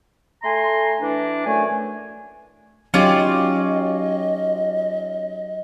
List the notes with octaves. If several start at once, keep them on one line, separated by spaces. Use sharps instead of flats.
A3 A4 G#5 A#5 C6
E3 D4
F#2 D3 A3 G#5
F#3 C#4 D#4 F4 G4 D5 D#5